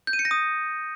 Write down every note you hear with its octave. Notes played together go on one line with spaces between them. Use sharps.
G6
D#7
C#7
A#6
D#6